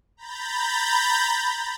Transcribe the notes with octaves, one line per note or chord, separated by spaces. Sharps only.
A#5 B5 G6 A6